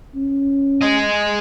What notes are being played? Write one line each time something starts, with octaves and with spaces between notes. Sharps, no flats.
C#4
G#4 D#5